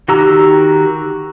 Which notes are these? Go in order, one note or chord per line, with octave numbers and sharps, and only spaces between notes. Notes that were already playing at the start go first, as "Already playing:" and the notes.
D#3 F#4 G4 A#5 E6